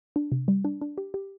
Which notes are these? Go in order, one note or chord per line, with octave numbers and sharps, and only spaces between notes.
D4
C3
G3
D4
D4
G4
G4